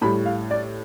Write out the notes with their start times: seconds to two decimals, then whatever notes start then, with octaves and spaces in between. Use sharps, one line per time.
0.01 A2 G3 B5
0.26 F5
0.51 D5